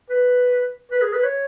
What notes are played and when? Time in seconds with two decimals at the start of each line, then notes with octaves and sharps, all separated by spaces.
0.10 B4
0.91 B4
1.02 G#4
1.13 B4
1.23 C#5